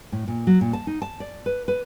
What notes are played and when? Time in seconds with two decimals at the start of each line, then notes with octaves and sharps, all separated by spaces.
0.12 A2
0.28 A#2
0.47 F#3
0.61 A#2
0.73 A5
0.87 D#4
1.02 A5
1.20 D5
1.46 B4
1.68 B4